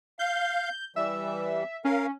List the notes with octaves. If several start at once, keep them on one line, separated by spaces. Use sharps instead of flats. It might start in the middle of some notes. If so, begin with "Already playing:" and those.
F5 G6
E3 G3 E5
C#4 A#4 F5